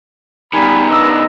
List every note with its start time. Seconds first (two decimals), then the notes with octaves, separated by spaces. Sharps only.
0.53 B2 D#3 G3 G#5 B5
0.90 B3 D4 B4 D#5 E6